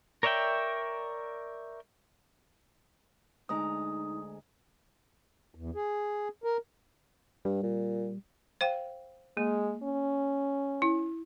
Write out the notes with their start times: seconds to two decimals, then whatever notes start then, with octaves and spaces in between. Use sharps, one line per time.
0.23 A#4 C#5 D5 E5 G5
3.49 D2 G#3 D#4 A#5 D#6
5.55 E2
5.75 G#4
6.44 A#4
7.45 G2 G3
7.63 A#2
8.61 C5 F5 G5
9.37 G#3 A#3
9.83 C#4
10.82 E4